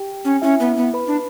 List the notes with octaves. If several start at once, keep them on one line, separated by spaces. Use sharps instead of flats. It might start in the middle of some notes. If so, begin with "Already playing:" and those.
Already playing: G4 G5
C#4
C#4 E4 E5
B3
B3
B4 B5
D4